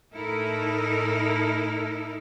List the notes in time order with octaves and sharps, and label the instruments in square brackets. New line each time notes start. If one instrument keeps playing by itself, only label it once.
[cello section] A2 D#4 E4 A4 A#4